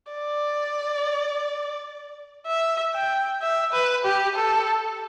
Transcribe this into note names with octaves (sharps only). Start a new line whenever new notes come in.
D5
E5
G5
E5
B4
G4
A4